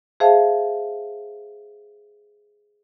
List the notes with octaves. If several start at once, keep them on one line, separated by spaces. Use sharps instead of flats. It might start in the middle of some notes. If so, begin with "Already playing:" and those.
G#4 C5 E5 F5 A5